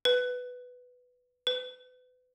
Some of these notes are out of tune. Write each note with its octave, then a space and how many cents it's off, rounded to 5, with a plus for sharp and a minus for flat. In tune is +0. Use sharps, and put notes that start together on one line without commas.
B4 +5
B4 +30